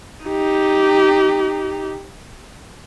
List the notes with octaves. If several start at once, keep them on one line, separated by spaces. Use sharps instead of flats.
D#4 G4